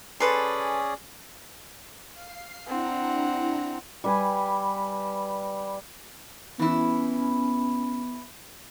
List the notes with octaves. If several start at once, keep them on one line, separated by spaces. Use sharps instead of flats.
C#4 G#4 A4 B4 D5 C6
F5 C7
C4 D4 E4 F#5 A#5
G3 B4 G#5
E3 B3 C#4 E4